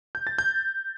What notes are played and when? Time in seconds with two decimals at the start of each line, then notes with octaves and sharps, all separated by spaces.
0.15 G6
0.27 A6
0.38 G6